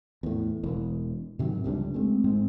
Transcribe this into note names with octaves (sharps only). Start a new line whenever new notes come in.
E2 A2
E1 E3
G#2 C3 D#3 F#3
F1 C#2 G3 D4
G#3 A3 C4
G#2 G#3 C4